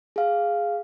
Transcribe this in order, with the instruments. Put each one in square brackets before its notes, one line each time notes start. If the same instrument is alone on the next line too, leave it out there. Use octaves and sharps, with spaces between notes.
[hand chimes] G#4 F5